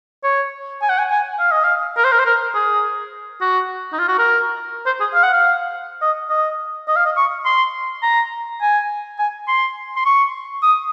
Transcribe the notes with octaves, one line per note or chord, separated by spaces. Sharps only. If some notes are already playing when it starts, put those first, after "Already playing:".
C#5
G#5
F#5
G#5
G#5
F5
D#5
F5
A#4
C5
A#4
C5
A#4
G#4
F#4
D#4
F4
F#4
A#4
C5
G#4
F5
F#5
F5
D#5
D#5
D#5
F5
D#5
C#6
C6
A#5
G#5
G#5
C6
C6
C#6
D#6